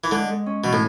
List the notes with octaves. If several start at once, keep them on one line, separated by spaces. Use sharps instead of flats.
E3
D3 G#3
G#3
C#4
B2 E3
A2